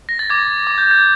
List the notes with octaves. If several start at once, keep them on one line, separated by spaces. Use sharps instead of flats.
A#6
A6
D6 G#6
D6
G6
G#6